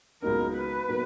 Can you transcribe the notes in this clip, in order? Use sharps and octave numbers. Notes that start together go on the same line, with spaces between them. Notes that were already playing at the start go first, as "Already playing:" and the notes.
C#2 B2 F#3 A#3 D#4 A#4
B4
B2 F#3 A#3 D#4